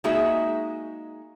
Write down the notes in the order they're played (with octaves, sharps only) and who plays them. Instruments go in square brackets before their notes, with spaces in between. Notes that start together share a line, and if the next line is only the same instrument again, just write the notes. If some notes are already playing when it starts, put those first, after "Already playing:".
[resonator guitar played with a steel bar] G#3 A#3 D#4 F#4 G#4 E5